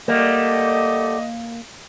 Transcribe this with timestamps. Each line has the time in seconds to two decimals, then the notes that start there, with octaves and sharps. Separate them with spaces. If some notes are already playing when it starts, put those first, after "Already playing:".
0.08 G3 A3 A#3 D5 D#5 F#5 D6